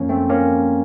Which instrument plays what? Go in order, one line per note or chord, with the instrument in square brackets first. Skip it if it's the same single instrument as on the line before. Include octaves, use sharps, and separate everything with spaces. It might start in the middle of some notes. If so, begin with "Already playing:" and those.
Already playing: [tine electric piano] F#2 F3 A#3 C#4
A3 C4
F3 A#3 C#4